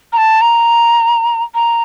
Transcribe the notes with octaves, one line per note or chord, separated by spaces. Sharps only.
A#5
A5
A#5
A#5